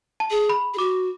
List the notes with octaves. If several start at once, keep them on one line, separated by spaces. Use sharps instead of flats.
A5
G#4
B5
G#4
F#4 D6